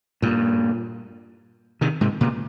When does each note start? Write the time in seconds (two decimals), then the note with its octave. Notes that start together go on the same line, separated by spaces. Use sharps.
0.22 G2 A#2
1.81 C3 D#3
2.01 G#2 C3
2.21 A#2 C#3